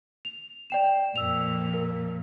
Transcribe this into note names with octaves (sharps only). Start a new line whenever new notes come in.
F7
D5 G5 E7
F2 A#2 E6 F7
A#4